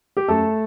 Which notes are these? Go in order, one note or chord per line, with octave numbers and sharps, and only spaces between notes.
G4
F#2 A3 A4